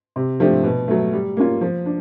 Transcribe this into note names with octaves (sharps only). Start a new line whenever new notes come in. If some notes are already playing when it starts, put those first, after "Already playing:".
C3
F3 A3 D4 G4
B2
F#3 A3
G3
A#3 C#4 F4
F3
D4